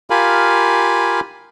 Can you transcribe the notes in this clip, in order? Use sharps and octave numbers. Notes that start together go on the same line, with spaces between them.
F4 G4 A#4 F5 G#5 B5